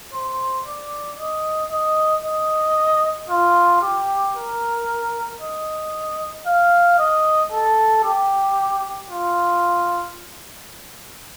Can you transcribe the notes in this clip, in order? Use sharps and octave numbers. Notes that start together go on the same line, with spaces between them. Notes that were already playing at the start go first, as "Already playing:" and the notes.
C5
D5
D#5
D#5
D#5
F4
G4
A#4
D#5
F5
D#5
A4
G4
F4